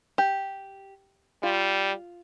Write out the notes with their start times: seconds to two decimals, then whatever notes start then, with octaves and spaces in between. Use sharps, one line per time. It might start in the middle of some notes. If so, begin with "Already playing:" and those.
0.18 G4
1.43 G3 F4